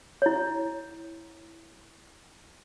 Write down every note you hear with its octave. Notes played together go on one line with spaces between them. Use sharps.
E4 C#5